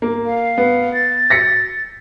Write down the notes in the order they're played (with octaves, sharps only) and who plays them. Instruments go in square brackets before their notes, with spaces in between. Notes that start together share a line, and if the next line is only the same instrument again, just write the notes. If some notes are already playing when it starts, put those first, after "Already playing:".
[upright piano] A#3
[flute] F5
[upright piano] B3
[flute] A6
[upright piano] A#6 B6 C#7